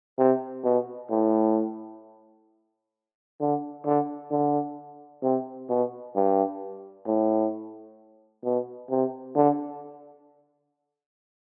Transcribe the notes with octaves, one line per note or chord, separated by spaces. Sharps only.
C3
B2
A2
D3
D3
D3
C3
B2
G2
A2
B2
C3
D3